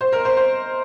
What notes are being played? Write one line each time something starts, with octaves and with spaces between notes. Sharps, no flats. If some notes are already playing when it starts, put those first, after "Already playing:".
C5
A#4
C5
C5